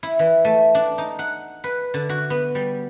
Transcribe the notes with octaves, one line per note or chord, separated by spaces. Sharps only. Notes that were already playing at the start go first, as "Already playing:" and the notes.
E4
E3
A3
D4
D#4
F#5
B4
D3
F#4
B3
G3